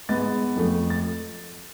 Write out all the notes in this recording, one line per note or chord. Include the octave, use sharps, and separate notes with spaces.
G#2 G#3 B3 A6
F2 F3 A3
A6